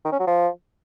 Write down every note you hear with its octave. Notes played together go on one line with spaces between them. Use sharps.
D#3
C#4
F#3
F3